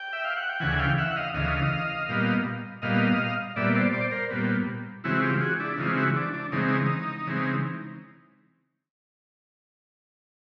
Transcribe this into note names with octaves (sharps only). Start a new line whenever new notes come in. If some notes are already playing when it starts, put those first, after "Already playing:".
Already playing: G5
E5
F5
F#5
G5
D2 C#3 E3 F#5 G#5
G#5
F5 G5
E5 F#5
F#5
D#5 F5
D2 C#3 E3 D#5 F5
A#2 G3 B3
A#2 G3 B3 D#5 F5
A#2 G3 B3 D5 E5
C5 D5
C5 D5
A#4 C5
A#2 G3 B3
C#3 E3 G#3 C4 E4 F#4
F4 G4
F#4 G#4
D4 E4
E4
C#3 E3 G#3 C4 D#4 F4
E4 F#4
D4
D4
C#3 E3 G#3 C4 D#4
C#3 E3 G#3 C4